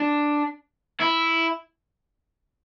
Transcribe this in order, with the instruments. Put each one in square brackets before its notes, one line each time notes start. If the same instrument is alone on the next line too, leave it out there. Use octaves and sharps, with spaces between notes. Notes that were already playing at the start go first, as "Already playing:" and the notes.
Already playing: [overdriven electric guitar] D4
E4